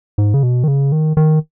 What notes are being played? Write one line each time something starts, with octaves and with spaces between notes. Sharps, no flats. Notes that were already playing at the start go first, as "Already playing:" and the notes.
G#2
C#3
B2
D#3
C#3
D#3
D#3